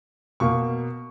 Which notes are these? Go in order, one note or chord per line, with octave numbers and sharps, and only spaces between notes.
B2 A#3 C#6